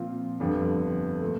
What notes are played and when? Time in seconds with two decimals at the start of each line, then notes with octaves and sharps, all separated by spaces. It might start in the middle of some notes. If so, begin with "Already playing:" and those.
Already playing: A#2 F3 C4 F4
0.40 G1 F2 D3 G3
1.22 A#2 A3